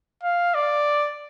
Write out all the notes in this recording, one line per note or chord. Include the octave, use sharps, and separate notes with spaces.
F5
D5